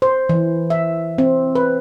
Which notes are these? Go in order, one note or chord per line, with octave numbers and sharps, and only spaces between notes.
C5
E3
E5
C4
B4